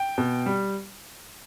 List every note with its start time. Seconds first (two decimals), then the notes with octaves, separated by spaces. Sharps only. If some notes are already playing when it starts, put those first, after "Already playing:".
Already playing: G5
0.18 B2
0.46 G3